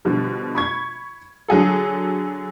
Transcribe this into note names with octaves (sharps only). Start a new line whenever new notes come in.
B2 D3 F3 G3
B5 C#6 G#6
D3 F#3 G#4 A4